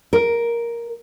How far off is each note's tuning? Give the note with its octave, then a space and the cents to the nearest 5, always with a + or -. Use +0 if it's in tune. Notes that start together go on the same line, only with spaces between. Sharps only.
A#4 +5